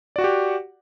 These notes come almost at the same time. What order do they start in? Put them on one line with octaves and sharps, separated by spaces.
D5 F#4 F#5 G4